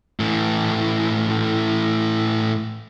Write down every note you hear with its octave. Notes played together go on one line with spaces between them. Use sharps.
A2 E3